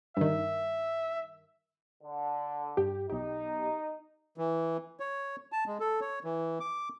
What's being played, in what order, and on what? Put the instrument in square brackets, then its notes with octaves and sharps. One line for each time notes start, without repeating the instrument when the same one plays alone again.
[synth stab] G2 D#3 [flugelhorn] E5
[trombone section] D3
[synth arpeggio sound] G2 G4
[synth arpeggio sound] B1 G4 [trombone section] D#4
[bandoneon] E3
C#5
A5
G#3
A4
C#5
E3
D6